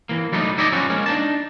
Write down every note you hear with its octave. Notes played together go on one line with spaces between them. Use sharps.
E3 A#3
F#3 G3 A3 B3 D#4
D#4 E4 G4 D5 D#5
F3 G3 G#3 C#4 F#4
G#3 A#3 C#4
D4 D#4 A5